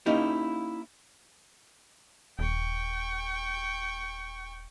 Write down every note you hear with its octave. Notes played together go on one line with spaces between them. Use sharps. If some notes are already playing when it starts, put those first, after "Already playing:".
A#3 C#4 D#4 E4 G4
D#1 G5 C#6